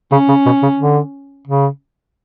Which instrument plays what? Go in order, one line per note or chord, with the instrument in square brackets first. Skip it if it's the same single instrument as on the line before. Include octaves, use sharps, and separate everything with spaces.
[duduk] C#3 [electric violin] C#4
[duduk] C#3
B2
C#3
D3
C#3